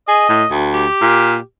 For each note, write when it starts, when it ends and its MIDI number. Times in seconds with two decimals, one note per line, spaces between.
0.08 0.29 68
0.08 0.51 75
0.29 0.44 45
0.51 0.86 38
0.74 1.42 67
1.01 1.37 46